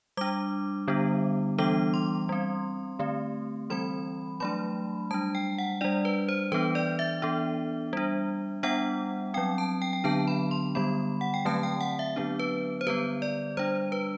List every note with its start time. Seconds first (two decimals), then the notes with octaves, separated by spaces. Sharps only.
0.17 G3 D4 D6
0.88 D3 G3 B3 D4
1.58 E3 G3 B3 D4 D6
1.94 C6
2.29 G3 C4
2.99 D3 A3 C4
3.70 E3 G3 C4 B5
4.40 F#3 A3 D4 B5
5.11 G3 D4 A5
5.35 G5
5.58 F#5
5.81 G3 D4 D5
6.05 B4
6.29 C5
6.52 E3 B3 D4 B4
6.75 D5
6.99 E5
7.22 E3 B3 D4
7.93 G3 D4
8.63 G3 B3 D4 F#5
9.34 F#3 C4 G5
9.58 A5
9.82 G5
9.93 G5
10.04 D3 F#3 B3 D4 A5
10.28 B5
10.51 C6
10.75 D3 G3 B3 B5
11.21 F#5
11.34 G5
11.45 D3 F#3 A3 C4 A5
11.63 G5
11.81 F#5
11.99 E5
12.16 D3 F#3 B3 D4
12.39 B4
12.81 C5
12.87 D3 G3 B3 B4
13.22 D5
13.57 G3 D4 C5
13.92 B4